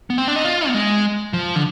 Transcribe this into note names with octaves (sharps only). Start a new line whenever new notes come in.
B3
C4
D4
D#4
F4
B3
G#3
F3
D3